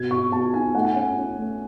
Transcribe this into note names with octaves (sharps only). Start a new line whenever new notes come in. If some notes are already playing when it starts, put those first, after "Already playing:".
Already playing: B2 G#6
B2 C#6
B2 A5
D#4 G#5
A3 F#5
G#5
C#4 F#5
C#4
A3